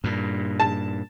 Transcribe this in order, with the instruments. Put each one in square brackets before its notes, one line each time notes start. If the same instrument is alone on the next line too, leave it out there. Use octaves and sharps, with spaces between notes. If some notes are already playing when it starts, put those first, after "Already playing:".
[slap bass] G2 A#2
[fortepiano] A5